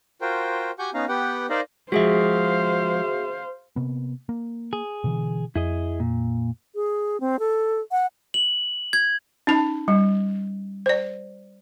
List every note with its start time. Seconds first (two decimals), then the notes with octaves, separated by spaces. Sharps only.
0.21 F4 F#4 A#4 C5 G5
0.79 F#4 G4 F#5 G#5 C#6 G6
0.94 B3 C#4 D#4 F5 A#5
1.09 B3 G4 B4 F#5 G5
1.50 D#4 A#4 C5 D5 D#5 F5
1.92 F3 G#3 F#4 G#4 C5 E5 F5
3.76 C3 A#3 B3
4.29 A#3
4.73 G#4
5.04 B2 D3 E3
5.56 F2 E4 G#4 D#5
6.00 A#2
6.75 G#4
7.20 C4
7.39 A4
7.92 F#5
8.34 F#7
8.93 G#6
9.47 C#4 D#4 A5
9.88 G3
10.86 C5 D5